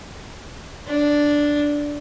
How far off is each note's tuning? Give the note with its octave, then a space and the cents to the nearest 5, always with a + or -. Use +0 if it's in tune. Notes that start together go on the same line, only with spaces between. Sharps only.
D4 -5